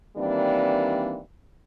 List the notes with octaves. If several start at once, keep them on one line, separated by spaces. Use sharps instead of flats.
D#3 E3 G3 A#3 C4 D4